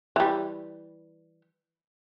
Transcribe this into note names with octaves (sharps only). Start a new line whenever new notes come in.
E3 G3